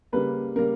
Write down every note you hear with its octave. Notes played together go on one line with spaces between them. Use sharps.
C#3 G3 A#3 B4
C#3 G3 A#3 A#4